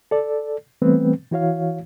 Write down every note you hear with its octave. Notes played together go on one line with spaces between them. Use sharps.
A4 D5
E3 G3 A3 B3 C4 B4
E3 E4 F#4 C#5 F5